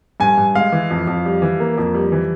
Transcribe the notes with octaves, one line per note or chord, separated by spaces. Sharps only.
G2 G#5
G2
G#3 F5
E3
F2
F2
G3
E3
A#3
F2
G3
E3